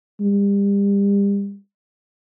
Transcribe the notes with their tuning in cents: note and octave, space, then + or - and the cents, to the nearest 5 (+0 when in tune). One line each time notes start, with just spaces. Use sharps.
G3 +35